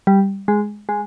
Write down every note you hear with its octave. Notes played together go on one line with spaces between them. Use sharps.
G3
G#3
G#3